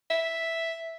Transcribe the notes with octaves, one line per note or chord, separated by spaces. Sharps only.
E5